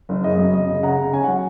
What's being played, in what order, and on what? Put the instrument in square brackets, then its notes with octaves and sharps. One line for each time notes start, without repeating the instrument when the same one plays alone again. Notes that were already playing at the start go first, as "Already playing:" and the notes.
[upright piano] F#1
C#3 D#5
F#2
F#2 D#5
C#3
C#3 F#5 A#5
C#3
C#4 G#5
F#3 F#5